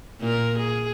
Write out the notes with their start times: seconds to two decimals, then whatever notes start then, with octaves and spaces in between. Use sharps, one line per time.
0.21 A#2 A#4
0.59 G#4